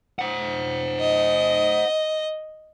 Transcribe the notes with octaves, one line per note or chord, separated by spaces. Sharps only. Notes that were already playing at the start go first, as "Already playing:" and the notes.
C5 F#5
D#5